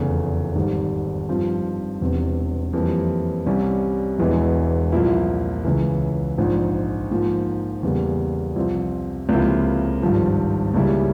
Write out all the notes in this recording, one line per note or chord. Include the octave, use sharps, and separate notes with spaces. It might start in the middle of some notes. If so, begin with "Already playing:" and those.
Already playing: F1 E2 C#3
G#1 G#2 G3
G2 F3 C4
E1 E2 C3
F2 E3 G3 A#3
C2 C3 G3 C#4
E1 E2 E3 G#3
C2 A#2 F3 A#3 E4
C#2 C#3 E3
A#1 G#2 F3
G#2 F3 A#3
E2 C#3 G3 A#3
C2 C3 F3 C4
C#2 C3 F3 A#3 E4
G#1 G2 F3
C#2 C#3 G3 A#3 E4